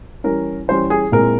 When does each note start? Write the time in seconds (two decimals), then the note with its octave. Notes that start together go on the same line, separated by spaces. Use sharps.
0.24 E3 G3 C#4 A#4
0.68 E3 G3 C#4 C5
0.90 G#4
1.12 A#2 G#3 C4 E4 A#4